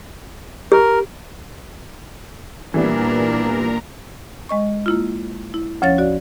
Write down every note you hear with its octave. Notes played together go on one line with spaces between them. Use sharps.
G4 A#4
A#2 E3 G3 A#3 B3 D4 A#4 A#5
G#3 D#5 C#6
A#3 E4 F4
E4
D2 F3 C#4 C#5 F5 A6
F#4 D5